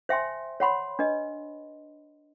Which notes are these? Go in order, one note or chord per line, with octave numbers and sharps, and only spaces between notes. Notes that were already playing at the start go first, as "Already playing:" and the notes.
C5 E5 G5 G#5 C6
C#5 F#5 B5 C6
D4 B4 D#5